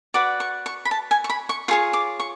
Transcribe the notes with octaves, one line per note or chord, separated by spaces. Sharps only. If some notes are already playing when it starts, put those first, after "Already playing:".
F#4 B4 D5 D6
C#6
C#6
B5
A5
G#5
C#6
B5
C#6
F4 G#4 C#5 C#6
D6
C#6